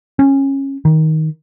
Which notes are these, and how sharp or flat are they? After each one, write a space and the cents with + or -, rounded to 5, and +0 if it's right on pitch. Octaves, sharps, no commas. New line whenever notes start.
C#4 -20
D#3 +15